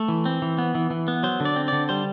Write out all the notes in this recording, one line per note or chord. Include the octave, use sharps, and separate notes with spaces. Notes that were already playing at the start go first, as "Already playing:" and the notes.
Already playing: A3 A4
E3
C4
E3
B3
E3
E3
B3
F#3 C5
D3
D5
C4
D3 D5
G3 C5